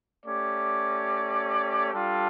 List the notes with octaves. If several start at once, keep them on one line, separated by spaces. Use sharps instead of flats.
A3 C#4 G4 D5
G3 D4 F4 A4